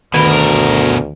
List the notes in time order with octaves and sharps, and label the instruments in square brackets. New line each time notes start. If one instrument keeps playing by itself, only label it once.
[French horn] D2 [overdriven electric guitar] B2 A#4 [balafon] D#3 B5